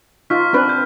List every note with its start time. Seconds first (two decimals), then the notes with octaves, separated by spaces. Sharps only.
0.30 D#4 F4 C#6 F6 B6
0.53 C4 D4 B4
0.69 G6